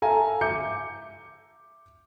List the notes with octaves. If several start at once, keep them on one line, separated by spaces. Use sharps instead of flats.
A4 E5 F5 G#5 A#5
E5 D6 G6 C#7